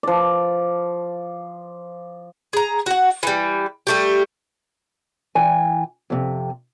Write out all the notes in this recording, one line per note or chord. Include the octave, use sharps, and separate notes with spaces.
F3 D5
G#4 A#5
F#4 F#5
E3 G3
G3 A3 G4
E3 G5 G#5
F2 C3